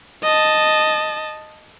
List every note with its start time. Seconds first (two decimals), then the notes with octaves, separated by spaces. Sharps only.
0.23 D#5 A5